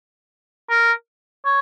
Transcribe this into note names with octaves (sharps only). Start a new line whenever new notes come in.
A#4
C#5